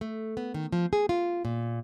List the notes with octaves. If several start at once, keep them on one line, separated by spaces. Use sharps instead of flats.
A3
B3
D#3
F3
G#4
F4
A#2